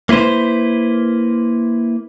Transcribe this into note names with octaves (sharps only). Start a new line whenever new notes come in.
A#3 E4 B4 C5